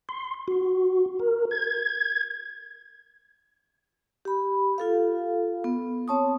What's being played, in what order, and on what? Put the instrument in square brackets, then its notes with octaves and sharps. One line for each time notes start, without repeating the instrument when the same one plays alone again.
[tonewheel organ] C6
F#4
A#4
G#6
[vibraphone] G4 B5
F4 A4 F5
B3
C4 C#5 A5 C#6 D#6